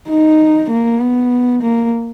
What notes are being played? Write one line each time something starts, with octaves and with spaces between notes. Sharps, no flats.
D#4
A#3
B3
A#3